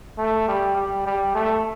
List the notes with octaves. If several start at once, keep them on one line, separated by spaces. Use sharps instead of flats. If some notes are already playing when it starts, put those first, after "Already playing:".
A3
G3
G3
G3
A3